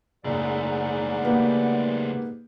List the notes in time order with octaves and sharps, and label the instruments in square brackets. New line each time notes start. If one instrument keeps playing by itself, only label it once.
[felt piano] F#1 [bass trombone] G#2 [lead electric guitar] C#3 A3 [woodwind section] D5 F#5
[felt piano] A#3 B3 G4